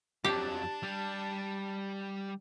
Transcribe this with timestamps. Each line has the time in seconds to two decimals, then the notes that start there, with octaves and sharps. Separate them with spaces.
0.25 F2 F#3 D4 G4 A5
0.83 G3